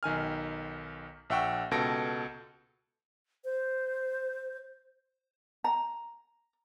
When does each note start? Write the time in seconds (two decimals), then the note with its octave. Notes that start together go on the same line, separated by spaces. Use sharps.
0.03 B1 D#3 G#5 F6
1.30 A#1 E5 F#5 G5 C#6
1.71 C#2 B2 A4 A#6 D7
3.45 C5
5.64 A#5